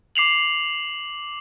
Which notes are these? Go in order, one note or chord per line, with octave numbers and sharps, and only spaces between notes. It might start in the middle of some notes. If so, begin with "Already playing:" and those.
D6 C7 F7 F#7